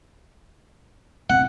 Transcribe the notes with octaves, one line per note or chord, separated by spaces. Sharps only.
E1 C4 F#5